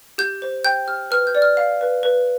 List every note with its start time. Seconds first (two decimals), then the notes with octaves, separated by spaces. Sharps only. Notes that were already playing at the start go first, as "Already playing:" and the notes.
0.18 G4 G6
0.42 C5
0.65 G5 G6
0.87 G4 F6
1.11 B4 F6
1.27 G6
1.35 D5
1.42 F6
1.57 F5
1.81 B4
2.03 B4